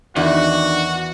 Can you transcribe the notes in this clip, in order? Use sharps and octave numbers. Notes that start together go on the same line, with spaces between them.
E2 D#3 D4 F#4 F#5